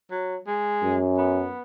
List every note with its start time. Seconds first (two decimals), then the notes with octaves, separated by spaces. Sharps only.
0.11 F#3
0.47 G#3
0.83 F#2
1.18 B3